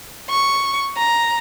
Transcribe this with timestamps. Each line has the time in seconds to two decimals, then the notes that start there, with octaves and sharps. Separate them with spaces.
0.30 C#6
0.97 A#5